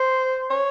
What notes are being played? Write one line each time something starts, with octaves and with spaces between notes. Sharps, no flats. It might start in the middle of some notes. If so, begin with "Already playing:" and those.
Already playing: C5
C#5